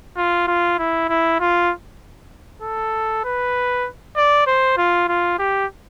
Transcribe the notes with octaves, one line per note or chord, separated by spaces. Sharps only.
F4
F4
E4
E4
F4
A4
B4
D5
C5
F4
F4
G4